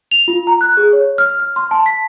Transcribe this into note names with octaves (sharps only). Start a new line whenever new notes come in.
F7
F4
A#5
F#6
G#4
C#5
F6
F6
C6
A5
B6